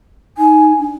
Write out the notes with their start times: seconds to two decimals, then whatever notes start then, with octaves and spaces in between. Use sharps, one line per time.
0.38 D#4 G#5
0.79 D4